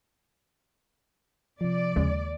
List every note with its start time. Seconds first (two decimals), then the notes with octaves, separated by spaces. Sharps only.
1.61 C3 F3 D5
1.96 D#2 C#3 G#3